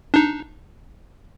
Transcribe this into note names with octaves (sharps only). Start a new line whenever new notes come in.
D4 D#4